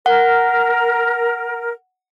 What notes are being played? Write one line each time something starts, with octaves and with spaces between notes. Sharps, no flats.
A#4 F#5